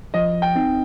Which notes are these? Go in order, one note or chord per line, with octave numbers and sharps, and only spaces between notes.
F3 D#5
G5
C4 D#4